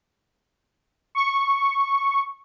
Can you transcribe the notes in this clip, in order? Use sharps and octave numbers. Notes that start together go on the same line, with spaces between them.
C#6